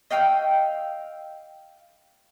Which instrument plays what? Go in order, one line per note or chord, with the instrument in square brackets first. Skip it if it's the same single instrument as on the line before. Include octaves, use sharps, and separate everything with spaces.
[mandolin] D#5 F5 G5 E6